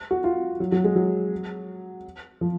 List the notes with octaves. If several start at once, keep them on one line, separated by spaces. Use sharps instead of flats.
F#4
F4
F#3
F#3
G#3
F#3
F3